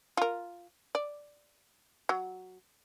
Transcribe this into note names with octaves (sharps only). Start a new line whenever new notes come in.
F4 A#4
D5
F#3